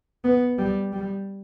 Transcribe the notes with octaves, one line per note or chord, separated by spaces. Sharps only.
B3
G3
G3